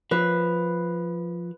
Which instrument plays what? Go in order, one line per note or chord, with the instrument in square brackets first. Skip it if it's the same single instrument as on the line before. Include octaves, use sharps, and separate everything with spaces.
[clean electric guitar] F3 [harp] B4